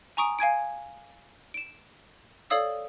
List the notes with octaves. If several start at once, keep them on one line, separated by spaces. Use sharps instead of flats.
G#5 A#5 C#6 D#6 D7
F5 G#5 G#6 D7
D7 E7
A4 C#5 D5 F5 D#6 E6